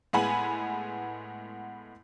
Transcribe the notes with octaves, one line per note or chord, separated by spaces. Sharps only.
A2 G#3 B3 G#5 B5 F#7